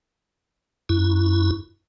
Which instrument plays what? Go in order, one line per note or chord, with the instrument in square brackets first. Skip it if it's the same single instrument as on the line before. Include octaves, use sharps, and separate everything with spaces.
[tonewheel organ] F#2 E4